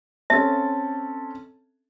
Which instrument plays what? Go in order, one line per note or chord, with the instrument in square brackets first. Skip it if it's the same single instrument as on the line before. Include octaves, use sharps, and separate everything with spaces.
[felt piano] C4 C#4 A4 [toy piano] E5 [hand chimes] A5 A6